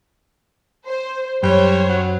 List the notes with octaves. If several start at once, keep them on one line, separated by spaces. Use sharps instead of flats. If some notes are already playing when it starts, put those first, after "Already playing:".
C5
F#2 G3 C5 C#5
F#3